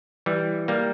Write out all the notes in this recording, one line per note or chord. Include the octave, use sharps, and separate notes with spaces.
E3 G3
G3 A#3